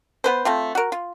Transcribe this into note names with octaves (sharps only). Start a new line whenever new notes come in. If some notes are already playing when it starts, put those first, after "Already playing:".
B3 B4 C5
A3 C4 F4
F#4 A#4
F4